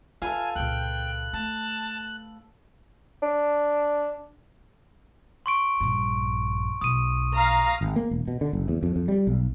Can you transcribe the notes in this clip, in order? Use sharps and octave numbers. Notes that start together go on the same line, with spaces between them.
F4 A4 B4 F5 G#5
C#2 A#2 G5 F#6
A3 A5
D4
C6 C#6 D7
A#1 G2
B1 D#6 D#7
F5 A#5
G#1
A#3
E1
B2
D3
F#1
E2
F2
F2
G3
B1